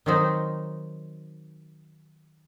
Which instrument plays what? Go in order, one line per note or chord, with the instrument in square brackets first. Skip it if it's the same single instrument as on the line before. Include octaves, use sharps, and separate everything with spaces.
[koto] D#3 F#3 C4 D#4